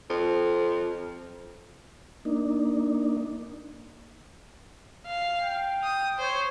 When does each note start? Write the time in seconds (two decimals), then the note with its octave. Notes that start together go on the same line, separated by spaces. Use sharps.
0.10 F2
2.25 A#3 D4 D#4
5.07 F5
5.40 G5
5.83 D#6
6.18 C5 C#5